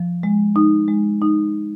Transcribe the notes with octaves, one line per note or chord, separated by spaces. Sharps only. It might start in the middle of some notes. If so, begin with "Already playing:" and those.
Already playing: F3
G#3
D#4
G#3
D#4